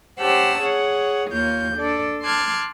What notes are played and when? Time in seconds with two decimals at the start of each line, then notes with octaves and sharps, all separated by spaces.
0.19 C#4 G4 C5 F#5 A5 E6
0.62 G#4 C#5 F#5
1.30 D#2 A#3 F4 C#5 G6
1.76 D4 A4 D5
2.22 A5 C6 D6 F6 F#6 G#6